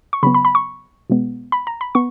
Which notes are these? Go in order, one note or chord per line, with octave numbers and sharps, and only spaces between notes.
C#6
C#3 F#3 B3 B5
B5
B5
C#6
B2 G#3 B3
B5
A#5
B5
B3 C#6